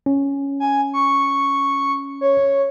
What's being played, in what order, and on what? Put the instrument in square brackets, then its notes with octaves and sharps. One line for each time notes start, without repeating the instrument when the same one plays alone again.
[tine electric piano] C#4
[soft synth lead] G#5
C#6
C#5